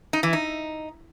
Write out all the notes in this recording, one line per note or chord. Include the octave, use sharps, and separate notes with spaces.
D#4
E3
D#4